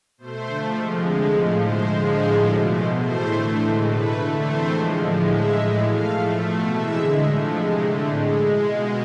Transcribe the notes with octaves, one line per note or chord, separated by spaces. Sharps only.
B2 A3 C5
D3 F3 A3
C3 F3 G#3
D3 G#3
A2 F3 A3 F4
B2 G#3 C5
D3 F3 G#3
A2 F3 G#3 C5
B2 A3 D5
B2 G#3 C5
A2 E3 A3 C5
D3 A3
A2 E3 G#3 C5
B2 A3 B4
D3 A3
C3 E3 A3 C5
D3 F3 G#3
A2 F3 G#3 D5
A2 G#3 E5
A2 E3 G#3
B2 A3 F5
A2 F3 A3
B2 A3
C3 E3 G#3 E5
D3 G#3
A2 F3 A3 G#4
C3 G#3 E4
D3 A3 C4
A2 G#3 D4
B2 G#3 E4
B2 G#3 F4